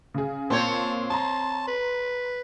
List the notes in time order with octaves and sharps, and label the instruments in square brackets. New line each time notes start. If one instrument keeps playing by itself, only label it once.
[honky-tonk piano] C#3 G#4
[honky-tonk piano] A#2 [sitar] C4 C#5 [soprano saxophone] A5
[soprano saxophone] A5 [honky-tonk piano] A#5 C6
[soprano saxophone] B4